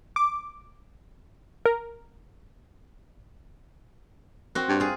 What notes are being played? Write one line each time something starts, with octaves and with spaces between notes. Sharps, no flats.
D6
A#4
C4 F#4
G2
F4 G#4